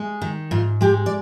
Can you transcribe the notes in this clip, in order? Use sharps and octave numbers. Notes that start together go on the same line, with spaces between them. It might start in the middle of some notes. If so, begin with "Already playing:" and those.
Already playing: G#3
D#3
G#2 F4
G#3 G4
D5